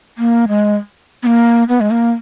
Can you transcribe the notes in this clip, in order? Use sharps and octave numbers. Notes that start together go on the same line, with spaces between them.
A#3
G#3
B3
A#3
B3
G#3
A#3